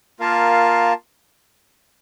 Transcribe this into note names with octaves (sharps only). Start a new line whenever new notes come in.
A#3 F4 A#4 F5 A5